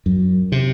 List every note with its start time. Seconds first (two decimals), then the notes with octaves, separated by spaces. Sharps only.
0.06 F#2
0.52 C3